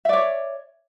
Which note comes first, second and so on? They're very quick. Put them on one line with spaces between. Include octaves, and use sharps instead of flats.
E5 D5 C#5